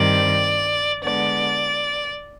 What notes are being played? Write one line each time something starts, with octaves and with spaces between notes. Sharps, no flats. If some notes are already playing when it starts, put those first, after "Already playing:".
Already playing: G2 D#3 G3 C4 D5
D3 G#3 B3 D5